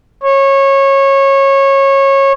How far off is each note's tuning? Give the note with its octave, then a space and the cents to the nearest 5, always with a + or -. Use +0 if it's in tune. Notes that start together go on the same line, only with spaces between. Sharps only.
C#5 -20